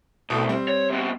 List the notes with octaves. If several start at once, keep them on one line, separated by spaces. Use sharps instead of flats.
C2 B2 A3
G3 C4
C#5
C3 B3